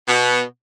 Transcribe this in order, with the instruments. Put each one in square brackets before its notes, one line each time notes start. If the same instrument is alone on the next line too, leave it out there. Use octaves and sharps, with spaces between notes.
[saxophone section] B2